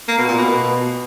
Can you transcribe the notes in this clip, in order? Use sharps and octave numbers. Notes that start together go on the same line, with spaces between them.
A#3
B2
A#2
B2